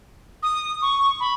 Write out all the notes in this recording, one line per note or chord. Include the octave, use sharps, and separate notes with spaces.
D#6
C#6
B5